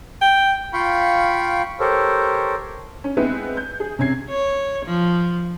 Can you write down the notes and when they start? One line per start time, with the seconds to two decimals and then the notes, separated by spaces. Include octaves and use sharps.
0.21 G5
0.73 F4 F5 G5 B5 C#6
1.80 G4 A4 A#4 C5 C#5
3.04 C#4
3.17 G#3 B3 C4 E4 B4
3.57 G6
3.80 G#4
3.99 C3 C#4 G#6 C7
4.30 C#5
4.85 F3